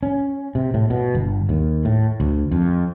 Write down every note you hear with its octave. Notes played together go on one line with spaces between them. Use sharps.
C#4
C3
A2
B2
G1
D#2
A2
D2
F2